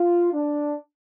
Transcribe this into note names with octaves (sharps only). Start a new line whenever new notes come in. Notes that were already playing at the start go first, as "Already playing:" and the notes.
Already playing: F4
D4